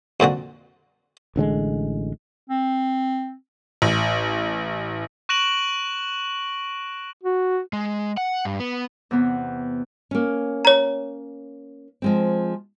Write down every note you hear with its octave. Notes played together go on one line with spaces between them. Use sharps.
F2 A#2 D3 F#4
A1 D3 F#3 G#3
C4
A1
C#6 F#6 A#6 D7 E7 F#7
F#4
G#3
F#5
G2
B3
E2 C3 B3
A#3 C#4
C#5 A#5
F3 G#3 C4